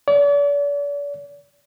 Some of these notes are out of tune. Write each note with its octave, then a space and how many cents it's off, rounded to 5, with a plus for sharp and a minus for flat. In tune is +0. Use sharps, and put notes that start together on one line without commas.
D5 -40